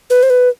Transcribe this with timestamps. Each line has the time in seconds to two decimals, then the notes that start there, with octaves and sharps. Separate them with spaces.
0.10 B4
0.23 C5
0.30 B4